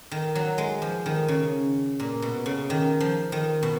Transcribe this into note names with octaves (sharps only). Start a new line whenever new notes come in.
D#3
F#3
G#3
F3
D#3
C#3
A#2
B2
C#3
D#3
F3
D#3
B2